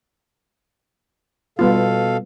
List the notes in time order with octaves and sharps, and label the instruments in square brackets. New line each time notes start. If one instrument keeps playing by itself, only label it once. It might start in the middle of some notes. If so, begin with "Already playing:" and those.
[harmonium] B2 A4 F5 [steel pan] G3 B3 F4